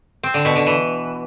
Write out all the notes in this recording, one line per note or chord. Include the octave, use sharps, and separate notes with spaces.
C4
D3
B2
D3
E3